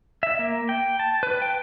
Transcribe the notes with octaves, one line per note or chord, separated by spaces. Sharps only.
E5
A#3
G5
A5
B4
G5